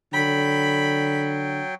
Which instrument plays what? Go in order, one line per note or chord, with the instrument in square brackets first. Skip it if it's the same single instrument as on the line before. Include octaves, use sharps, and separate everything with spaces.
[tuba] D3 [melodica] F#3 G5 [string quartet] B5